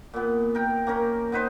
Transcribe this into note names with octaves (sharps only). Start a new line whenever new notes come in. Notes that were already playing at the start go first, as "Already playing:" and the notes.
A#2 B3
A#4 G5
A#3 C#4 A#4
B3 D#4 B4 C5